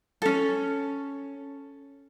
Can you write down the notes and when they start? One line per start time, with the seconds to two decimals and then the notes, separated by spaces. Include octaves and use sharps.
0.22 C#4 A4